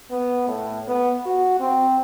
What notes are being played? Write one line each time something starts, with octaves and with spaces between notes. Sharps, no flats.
B3
A2
B3
F#4
C4